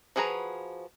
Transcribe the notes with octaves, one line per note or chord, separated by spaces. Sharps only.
F3 F#4 G#4 B4 A#5